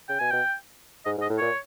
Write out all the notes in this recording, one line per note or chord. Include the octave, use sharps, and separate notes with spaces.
C#3 G5
B2 G#5
B2 G5
G#2 D#5
G#2
D#5
A2
A#2 C#5